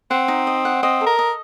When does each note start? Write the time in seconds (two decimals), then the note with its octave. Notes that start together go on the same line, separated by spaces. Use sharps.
0.11 C4 F#5
0.28 D#4
0.47 D#5
0.65 F#5
0.83 C4 D#5
1.01 A4
1.06 A#4
1.19 D#5